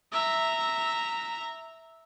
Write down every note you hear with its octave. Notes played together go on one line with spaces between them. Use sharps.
E5 A#5